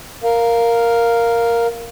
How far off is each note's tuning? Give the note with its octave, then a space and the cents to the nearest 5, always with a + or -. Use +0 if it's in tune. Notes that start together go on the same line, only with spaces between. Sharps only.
A#4 +0 F5 +0